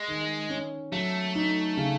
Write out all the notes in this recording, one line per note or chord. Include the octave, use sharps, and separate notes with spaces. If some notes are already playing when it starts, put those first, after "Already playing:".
Already playing: G#3
D#3
C#4
F#3 A3
D#4
C#3